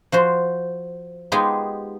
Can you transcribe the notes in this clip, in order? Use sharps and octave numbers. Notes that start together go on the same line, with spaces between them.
F3 F#4 C5
G#3 B3 D#4 F4 G4 G#4